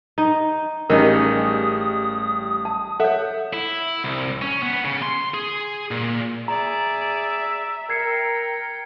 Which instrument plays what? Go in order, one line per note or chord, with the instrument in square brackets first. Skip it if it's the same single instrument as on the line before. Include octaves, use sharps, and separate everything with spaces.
[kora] D#4
[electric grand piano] A1 G3 [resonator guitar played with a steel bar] C#4 D#4 G#4 [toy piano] A#4 D#5 [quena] D#6
[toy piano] A5
[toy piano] A4 C#5 [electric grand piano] E5 F#5
[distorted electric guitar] E4
C2
C#4
B3
C#3
C6
G#4
A#2
[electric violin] G#4 D5 [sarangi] E5 [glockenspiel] A#5
[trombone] A#4 [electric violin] G5 [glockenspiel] G#6 C7 C#7